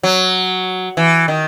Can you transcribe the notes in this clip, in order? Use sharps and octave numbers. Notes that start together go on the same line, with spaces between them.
F#3
E3
D#3